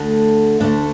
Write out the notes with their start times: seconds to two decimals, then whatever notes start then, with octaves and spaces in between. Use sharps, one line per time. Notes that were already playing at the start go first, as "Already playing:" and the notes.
Already playing: D2 D3 A3
0.60 D2 D3 A3 D4